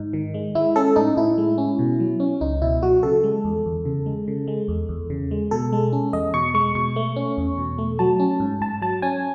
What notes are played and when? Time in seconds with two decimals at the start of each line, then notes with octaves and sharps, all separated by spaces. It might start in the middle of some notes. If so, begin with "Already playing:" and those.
Already playing: G#2 D#4
0.13 D#3
0.34 G#3
0.55 G#3 E4
0.76 C#4 A4
0.96 A2 D#4
1.17 A2 E4
1.38 G#3
1.58 C#4
1.79 B2
2.00 F#3
2.20 C#4
2.41 C#2 D#4
2.62 B2 E4
2.82 F#3 F#4
3.03 C#3 A4
3.24 G#3
3.45 E2
3.66 E2
3.85 C#3
4.06 G#3
4.28 C#3
4.47 G#3
4.68 E2
4.89 E2
5.10 C#3
5.31 G#3
5.51 B2 A4
5.72 G#3
5.93 C#4
6.13 E2 D#5
6.33 B2 C#6
6.54 G#3 C#6
6.75 B2 C#6
6.96 A3
7.16 C#4
7.37 E2
7.58 B2
7.78 A3
7.99 F#3 A5
8.20 C#4
8.40 G#2
8.61 G#2 A5
8.82 F#3 A5
9.02 C#4 G#5